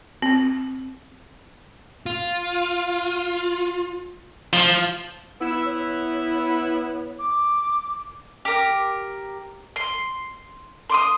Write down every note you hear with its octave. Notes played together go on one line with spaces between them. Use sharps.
C4
F4
F3
B3 E4 E6
C#5
D6
G4 A#4
C6
C6 D6 D#6